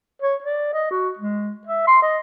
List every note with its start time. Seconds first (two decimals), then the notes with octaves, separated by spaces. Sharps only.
0.22 C#5
0.44 D5
0.73 D#5
0.91 F#4
1.19 G#3
1.67 E5
1.87 C6
2.02 D#5